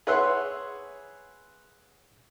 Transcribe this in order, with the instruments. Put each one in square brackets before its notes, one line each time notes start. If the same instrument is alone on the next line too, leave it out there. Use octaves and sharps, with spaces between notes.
[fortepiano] G#4 B4 C#5 E5 F#5 C6